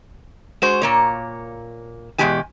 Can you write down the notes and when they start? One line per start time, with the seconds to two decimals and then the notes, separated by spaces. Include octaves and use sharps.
0.62 G#3 F#4 C5
0.82 A#2 A#3 C#5
2.18 E2 G#2 B2 G#3 G4 G#5